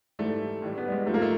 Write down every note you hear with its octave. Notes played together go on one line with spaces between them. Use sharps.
G#2 E3 G3 A3
A2 E3 G3
B3
G3
G#3
G#2 F3 A3
A#3
A3